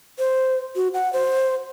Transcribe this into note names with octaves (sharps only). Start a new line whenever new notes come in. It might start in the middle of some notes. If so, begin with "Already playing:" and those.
C5
F#4
F#5
C5